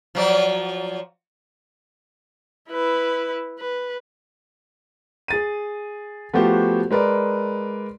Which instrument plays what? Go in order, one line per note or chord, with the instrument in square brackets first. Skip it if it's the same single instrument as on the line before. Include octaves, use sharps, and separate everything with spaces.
[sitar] F3 F#3 D5
[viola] E4 B4
B4
[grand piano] G#4 A6 D#7
F3 A3 B3 F#4 G4 C5
G#3 A#4 B4 D5